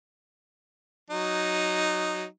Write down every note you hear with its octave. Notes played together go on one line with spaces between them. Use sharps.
F#3 D#4